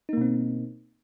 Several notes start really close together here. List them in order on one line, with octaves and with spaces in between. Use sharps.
D#4 A#3 B2 C4